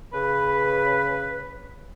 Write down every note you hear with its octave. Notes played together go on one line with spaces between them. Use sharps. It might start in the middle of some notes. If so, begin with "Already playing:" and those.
C#3 B4